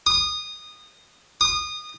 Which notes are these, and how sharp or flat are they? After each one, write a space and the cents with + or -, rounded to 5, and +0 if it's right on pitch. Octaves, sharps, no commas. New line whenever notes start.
D#6 -20
D#6 -25